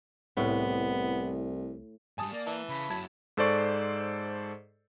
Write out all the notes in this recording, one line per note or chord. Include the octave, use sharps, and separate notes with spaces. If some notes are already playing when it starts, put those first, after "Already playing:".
C2 A2 B3
G#2 G3 G#5 A5 D#6
A#3 D5
E3 A5
C#3 B5
F#2 F#3 E4 A5 G#6
G#2 A4 C5 D5 C#6